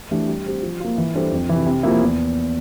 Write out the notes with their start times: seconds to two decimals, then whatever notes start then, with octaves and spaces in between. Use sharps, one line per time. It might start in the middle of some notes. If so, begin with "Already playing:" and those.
0.11 E3 A3 D4 G4
0.28 G3
0.46 C4 G4
0.62 F3
0.80 A#3 F4
0.98 E3
1.15 G3 D4 A4 C5
1.32 F2
1.49 C3 E3
1.66 C3
1.83 F3 A#3 E4
2.01 E2